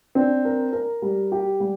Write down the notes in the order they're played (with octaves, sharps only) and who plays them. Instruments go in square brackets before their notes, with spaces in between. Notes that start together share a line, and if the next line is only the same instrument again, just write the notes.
[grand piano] C4 [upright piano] D4
[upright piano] A#4
A#4
G3
G4
G3